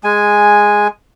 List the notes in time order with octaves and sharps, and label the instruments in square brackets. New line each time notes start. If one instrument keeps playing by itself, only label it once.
[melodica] G#3 G#5